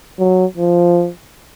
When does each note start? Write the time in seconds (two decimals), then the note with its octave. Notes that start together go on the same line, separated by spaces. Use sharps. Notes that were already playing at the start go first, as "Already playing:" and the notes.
0.19 F#3
0.57 F3